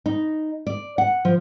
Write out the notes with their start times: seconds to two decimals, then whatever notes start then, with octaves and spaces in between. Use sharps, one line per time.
0.06 D#4
0.67 D5
0.98 F#5
1.25 F3